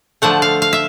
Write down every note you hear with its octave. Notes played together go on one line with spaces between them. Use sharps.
D3 F3 A3 F#5
F5
F5
E5